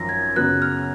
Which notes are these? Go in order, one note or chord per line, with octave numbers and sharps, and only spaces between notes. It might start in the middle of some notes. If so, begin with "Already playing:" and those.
Already playing: G#1 F#2 F3 A#6
G#6
F#2 C#3 F#3 B3 F#6
F6